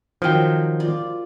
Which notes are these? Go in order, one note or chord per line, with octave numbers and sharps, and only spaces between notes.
D#3 F3 F#3 G5
F4 D5